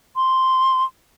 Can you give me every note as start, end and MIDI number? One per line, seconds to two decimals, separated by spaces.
0.16 0.84 84